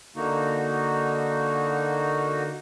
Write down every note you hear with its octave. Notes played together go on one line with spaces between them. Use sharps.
D3 A#3 D#4 F#4